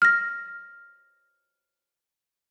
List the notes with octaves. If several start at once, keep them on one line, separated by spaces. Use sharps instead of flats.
F6 A#6